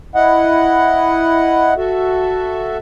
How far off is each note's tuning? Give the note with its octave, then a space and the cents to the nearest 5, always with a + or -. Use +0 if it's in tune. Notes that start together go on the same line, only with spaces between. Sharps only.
E4 +0 D#5 +0 F#5 +0
F#4 +0 A4 +0 E5 +5